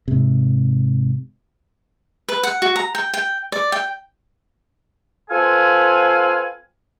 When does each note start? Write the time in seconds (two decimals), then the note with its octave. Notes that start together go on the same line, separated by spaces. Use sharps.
0.08 G#2 C3
2.29 B4
2.43 F#5
2.62 F#4
2.76 A#5
2.95 G5
3.14 G5
3.52 D5
3.72 G5
5.30 C4 F4 A4 B4 F5 G#5